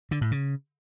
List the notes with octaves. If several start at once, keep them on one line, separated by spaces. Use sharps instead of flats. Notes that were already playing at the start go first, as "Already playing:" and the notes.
D3
A2
C#3